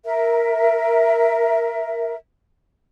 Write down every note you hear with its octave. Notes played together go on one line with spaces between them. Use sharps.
A#4 E5